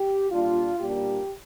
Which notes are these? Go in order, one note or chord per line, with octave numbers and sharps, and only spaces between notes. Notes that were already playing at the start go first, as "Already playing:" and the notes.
Already playing: G4
A#2 G3 D4 F4
A#2 G3 A#3 D4 G4